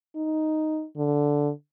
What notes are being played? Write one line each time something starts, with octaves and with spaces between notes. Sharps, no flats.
D#4
D3